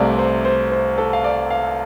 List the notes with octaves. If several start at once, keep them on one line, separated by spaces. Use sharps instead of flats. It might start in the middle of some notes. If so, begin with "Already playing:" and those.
Already playing: C2 C3 A3 C4 D5 F5
C5
C5
C5
A4
F5
D5
F5